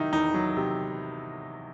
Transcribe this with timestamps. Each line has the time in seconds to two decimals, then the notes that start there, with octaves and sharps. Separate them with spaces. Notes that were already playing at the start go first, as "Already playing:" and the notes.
Already playing: C3 D#3 F#3 D#4 E4
0.12 E2 D#4
0.34 F#3
0.57 C3